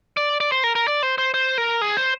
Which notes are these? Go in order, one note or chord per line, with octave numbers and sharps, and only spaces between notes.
D5
D5
C5
A#4
A#4
D5
C5
C5
C5
A#4
G#4
C5